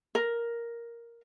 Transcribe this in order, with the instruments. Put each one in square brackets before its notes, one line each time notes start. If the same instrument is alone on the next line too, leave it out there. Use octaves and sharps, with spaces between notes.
[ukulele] A#4